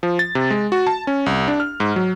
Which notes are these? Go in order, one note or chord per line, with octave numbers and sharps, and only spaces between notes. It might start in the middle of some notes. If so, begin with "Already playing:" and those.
F3
A6
C3
G#3
F#4
A5
C#4
C2
D4
F6
G#2
F#3